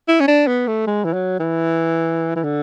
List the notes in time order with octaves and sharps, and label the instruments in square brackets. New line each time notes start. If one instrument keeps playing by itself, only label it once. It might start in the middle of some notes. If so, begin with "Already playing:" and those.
[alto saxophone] E4
C#4
D4
B3
A3
G#3
E3
F#3
E3
E3
D3